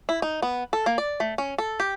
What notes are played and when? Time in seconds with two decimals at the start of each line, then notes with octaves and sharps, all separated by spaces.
0.09 E4
0.22 D#4
0.42 B3
0.73 A4
0.86 A#3
0.98 D5
1.20 A3
1.38 C#4
1.58 A4
1.80 G4